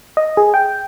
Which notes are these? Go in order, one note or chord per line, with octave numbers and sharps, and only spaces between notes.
D#5
G#4
G5